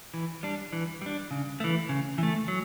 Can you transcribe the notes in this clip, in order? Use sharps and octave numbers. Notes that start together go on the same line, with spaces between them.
E3
G3 D4
E3
G3 D4
C#3
E3 A3
C#3
E3 A3
F#3